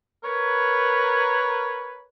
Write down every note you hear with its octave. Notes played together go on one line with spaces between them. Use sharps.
A#4 B4 C#5